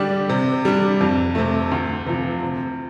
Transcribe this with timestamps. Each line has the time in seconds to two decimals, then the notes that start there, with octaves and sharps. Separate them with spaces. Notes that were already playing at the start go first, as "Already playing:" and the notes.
Already playing: D3 G3 D4 G4 D5
0.29 C3
0.65 G3 D4
1.01 F2
1.35 C3 A3
1.71 D2
2.06 C3 F3
2.43 C3